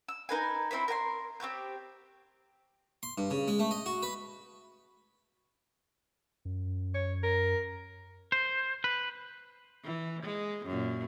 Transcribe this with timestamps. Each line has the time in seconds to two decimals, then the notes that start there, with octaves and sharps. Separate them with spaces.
0.08 E6
0.29 D#4 A#4 B4 G#5
0.71 C4 E4 C5 B5
0.88 A#4 C#5 G5 C6
1.40 C4 G4 C#5 G6
3.03 C6
3.18 G2
3.31 C#3
3.48 G#3
3.59 A3
3.71 D#5
3.86 F#4
4.03 B4
6.45 F#2
6.94 C#5
7.23 A#4
8.32 C5
8.84 B4
9.84 E3
10.23 G#3
10.66 F#2 A#2